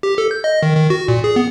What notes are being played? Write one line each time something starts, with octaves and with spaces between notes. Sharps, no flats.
G4
A4
G6
D#5
D#3
D#3
F#4
A#2
G#4
B3